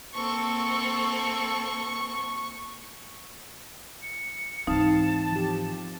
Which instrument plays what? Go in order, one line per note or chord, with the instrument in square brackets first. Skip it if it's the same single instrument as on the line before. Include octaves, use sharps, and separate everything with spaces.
[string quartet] A#3 C4 A4 [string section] C#6
[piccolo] C#7
[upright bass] G#2 E3 [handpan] C4 F5 [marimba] D#4 [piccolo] A5
[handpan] F3 G4